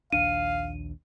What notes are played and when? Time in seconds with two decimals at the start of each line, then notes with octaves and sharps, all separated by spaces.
0.13 A#1 D#2 D4 F5 D#7